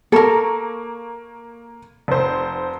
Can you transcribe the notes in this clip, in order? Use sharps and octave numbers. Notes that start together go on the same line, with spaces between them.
A#3 A4 A#4 A#5 C#6
F1 C5